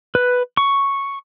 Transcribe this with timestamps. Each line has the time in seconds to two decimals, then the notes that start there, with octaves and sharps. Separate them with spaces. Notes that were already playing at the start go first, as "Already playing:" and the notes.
0.15 B4
0.57 C#6